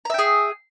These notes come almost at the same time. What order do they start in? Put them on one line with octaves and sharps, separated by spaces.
A#5 E5 G5 G#4